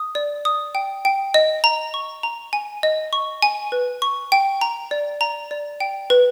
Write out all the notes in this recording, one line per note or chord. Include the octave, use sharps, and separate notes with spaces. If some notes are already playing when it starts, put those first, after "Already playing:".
Already playing: D#6
D5
D#6
G5
G5
D#5
A#5
C#6
A#5
G#5
D#5
C#6
G#5
B4
C#6
G5
A#5
D5
A#5
D5
G5
B4